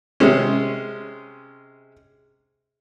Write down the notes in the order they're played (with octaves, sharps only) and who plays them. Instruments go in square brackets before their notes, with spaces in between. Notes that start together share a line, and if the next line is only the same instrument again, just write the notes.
[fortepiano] C3 G#3 C#4